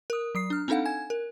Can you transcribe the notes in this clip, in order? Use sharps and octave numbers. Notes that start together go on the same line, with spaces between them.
A#4 D#6
F#3 D#6 C7
D4 F6
C4 D4 D#4 A4 F5 F#5
G#5 G#6
A#4